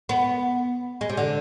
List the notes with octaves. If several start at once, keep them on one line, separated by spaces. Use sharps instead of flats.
B3
G#3
C3
D3